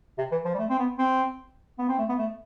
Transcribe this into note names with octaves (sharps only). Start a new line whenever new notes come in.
C3
E3
F3
G3
A3
C4
B3
C4
B3
C4
A3
B3
A3